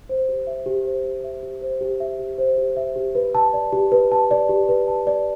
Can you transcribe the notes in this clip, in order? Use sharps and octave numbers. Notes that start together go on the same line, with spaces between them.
C5
G4
E5
G4
C5
G4
E5
G4
C5
G4
E5
G4
C5
G4
E5
G4
B4
A5
D5
G4
B4
A5
D5
G4
B4
A5
D5